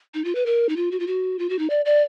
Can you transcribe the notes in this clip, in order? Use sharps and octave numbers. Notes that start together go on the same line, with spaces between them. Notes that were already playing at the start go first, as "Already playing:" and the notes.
D#4
F4
B4
A#4
D#4
F4
F#4
F4
F#4
F4
F#4
D#4
D5
D5